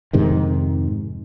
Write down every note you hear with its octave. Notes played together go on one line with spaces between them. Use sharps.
F2 G#2 C3 D#3